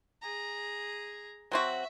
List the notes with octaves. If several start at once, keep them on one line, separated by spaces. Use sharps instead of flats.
G#4 A#5
F#3 C4 F#4 E5